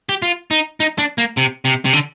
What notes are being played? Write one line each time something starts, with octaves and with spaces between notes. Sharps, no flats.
G4
F4
D#4
D#4
D4
A#3
C3
C3
C3
D3